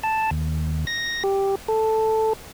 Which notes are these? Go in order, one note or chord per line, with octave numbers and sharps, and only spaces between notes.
A5
D#2
A#6
G4
A4